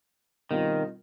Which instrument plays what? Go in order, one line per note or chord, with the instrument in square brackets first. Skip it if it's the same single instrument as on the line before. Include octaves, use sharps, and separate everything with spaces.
[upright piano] B2 G3 C4 F4 [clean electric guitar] D#3